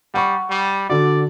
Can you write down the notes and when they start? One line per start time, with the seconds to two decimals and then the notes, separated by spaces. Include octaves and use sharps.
0.14 G3 F#5 C#6
0.50 G3
0.90 D3 F#4 D5